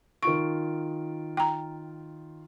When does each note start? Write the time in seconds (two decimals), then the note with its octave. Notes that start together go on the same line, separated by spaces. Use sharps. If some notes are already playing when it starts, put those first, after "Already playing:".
0.23 D#3 F4 C#6 D7
1.37 G5 A#5